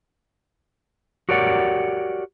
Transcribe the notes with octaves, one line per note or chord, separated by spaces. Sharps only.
F#4 G4 A#4 C#5 D5 F#5